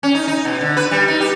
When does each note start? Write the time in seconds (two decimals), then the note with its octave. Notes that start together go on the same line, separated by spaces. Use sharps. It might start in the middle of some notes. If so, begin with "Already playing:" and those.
0.03 C#4
0.15 D#4
0.28 D#4
0.45 B2
0.61 D3
0.77 B4
0.91 G3
1.08 D#4
1.20 G4